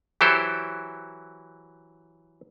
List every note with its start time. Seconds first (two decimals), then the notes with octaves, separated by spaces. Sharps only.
0.21 E3 F#3 E4 G4 A4 C5